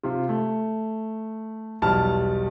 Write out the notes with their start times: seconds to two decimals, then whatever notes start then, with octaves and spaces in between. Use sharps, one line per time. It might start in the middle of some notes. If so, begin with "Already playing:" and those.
0.03 C3 F4
0.29 A3
1.82 B1 E2 G3 A5 F6